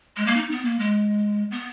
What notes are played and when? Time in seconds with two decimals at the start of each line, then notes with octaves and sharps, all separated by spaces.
0.17 G#3
0.27 A#3
0.37 D#4
0.51 B3
0.65 A#3
0.79 G#3
1.51 B3